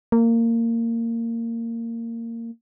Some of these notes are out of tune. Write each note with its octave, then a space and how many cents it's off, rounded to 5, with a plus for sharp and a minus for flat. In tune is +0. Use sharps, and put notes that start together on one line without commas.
A#3 -20